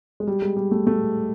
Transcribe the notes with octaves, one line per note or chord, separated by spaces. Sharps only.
G#3
G3
G#3
G3
A3
A3